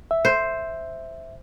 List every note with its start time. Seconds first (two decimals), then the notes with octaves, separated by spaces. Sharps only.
0.11 E5
0.25 C5